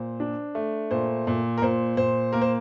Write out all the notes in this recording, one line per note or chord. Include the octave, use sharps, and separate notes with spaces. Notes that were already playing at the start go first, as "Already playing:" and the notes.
Already playing: A#2 C5
D4
A3
A#2 C5
A#2
A#4
A#2 C5
A#2 C5
A#3 A#4
C5